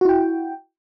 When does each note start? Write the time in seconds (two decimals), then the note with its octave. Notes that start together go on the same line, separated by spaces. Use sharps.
0.01 F#4
0.05 E4
0.09 G5